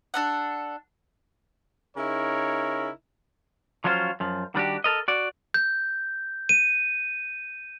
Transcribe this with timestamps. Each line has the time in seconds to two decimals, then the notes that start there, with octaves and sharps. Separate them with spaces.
0.14 D4 A4 F#5
1.97 C#3 D#4 E4 A#4 C#5
3.84 F3 F#3 C#4 F4 C5
4.20 F#2 F3
4.55 D#3 G3 D4 F#4 G4
4.84 A4 A#4 D#5
5.08 F#4 D5
5.54 G6
6.49 D#7